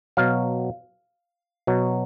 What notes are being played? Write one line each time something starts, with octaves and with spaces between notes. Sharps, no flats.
B2 F#3 F5
B2 F#3